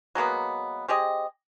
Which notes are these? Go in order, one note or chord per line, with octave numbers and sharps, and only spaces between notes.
F#3 G#3 A#3 B3
C4 G4 G#4 D#5